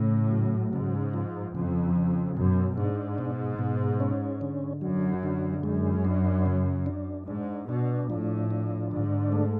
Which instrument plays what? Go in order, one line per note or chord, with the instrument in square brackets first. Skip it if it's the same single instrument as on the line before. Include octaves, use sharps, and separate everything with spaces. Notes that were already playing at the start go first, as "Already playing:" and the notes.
Already playing: [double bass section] A2 [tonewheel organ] C#3
[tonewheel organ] F#3
[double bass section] G#2 [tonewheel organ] C#3
[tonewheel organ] F3
[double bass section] F2 [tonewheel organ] C#3
[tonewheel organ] C#3
[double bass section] F#2 [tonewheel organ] B2
[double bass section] G#2 [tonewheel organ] D4
[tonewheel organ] B2
B2
C#4
D3
[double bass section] F#2 [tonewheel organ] F#3
[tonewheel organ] D3
[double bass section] F#2 [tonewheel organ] G#3
[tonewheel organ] D4
C#3
D4
[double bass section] G#2 [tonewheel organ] D4
[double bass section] B2 [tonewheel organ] D4
[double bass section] A2 [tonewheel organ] F3
[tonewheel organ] D4
[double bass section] G#2 [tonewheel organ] D3
[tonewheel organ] A3